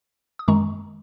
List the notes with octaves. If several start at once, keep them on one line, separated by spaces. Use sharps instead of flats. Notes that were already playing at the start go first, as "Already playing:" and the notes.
D#6
F#2 D#3 G#3 A#5 C#6